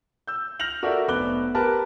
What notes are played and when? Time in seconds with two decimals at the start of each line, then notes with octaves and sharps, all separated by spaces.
0.27 E6 G6
0.59 F6 G6 A#6 F7 F#7
0.83 F#4 A4 A#4 D5 E5
1.08 F1 B3 D6 F#6 G7
1.55 G4 A#4 B4 A5